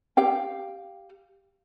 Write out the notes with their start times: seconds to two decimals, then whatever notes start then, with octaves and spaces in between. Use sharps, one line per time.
0.17 G4 F5 G5